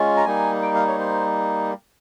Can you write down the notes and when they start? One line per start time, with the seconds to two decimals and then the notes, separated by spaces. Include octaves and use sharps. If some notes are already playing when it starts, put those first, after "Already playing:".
Already playing: G#3 C#4 F4
0.17 A#5
0.25 G3 A#3 D#4 G#5
0.62 G5
0.75 F5
0.87 C#5
0.99 C5